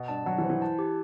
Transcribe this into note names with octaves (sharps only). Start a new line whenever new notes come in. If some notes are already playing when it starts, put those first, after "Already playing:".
Already playing: B2
G2 A5
F#3 F#5
E3
C5
E3
A5
G4